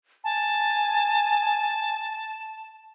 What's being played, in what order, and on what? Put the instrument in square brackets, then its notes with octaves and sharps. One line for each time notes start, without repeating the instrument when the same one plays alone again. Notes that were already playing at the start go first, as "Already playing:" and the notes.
[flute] G#5 [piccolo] A5